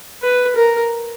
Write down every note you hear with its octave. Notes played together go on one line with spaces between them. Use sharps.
B4
A#4